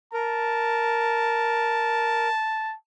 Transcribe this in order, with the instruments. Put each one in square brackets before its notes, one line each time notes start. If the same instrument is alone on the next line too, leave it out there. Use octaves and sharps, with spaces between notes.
[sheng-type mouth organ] A#4 [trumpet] A5